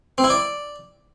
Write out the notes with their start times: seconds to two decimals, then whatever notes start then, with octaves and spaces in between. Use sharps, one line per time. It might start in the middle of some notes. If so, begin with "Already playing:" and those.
0.18 C4
0.24 E4
0.30 D5